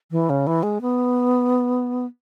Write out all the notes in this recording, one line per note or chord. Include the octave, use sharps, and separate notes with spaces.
E3
C#3
E3
G#3
B3